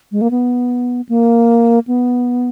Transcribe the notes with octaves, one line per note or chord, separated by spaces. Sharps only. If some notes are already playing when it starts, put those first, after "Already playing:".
G#3
A#3
B3
A#3
B3